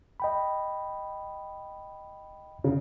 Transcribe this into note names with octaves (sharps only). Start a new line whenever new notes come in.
D#5 G5 B5
C#3